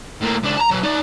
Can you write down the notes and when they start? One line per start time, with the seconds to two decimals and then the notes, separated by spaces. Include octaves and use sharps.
0.21 A2 A#3
0.43 C#2 D4
0.57 A5 A#5
0.71 F#3 B4
0.83 D#4 D5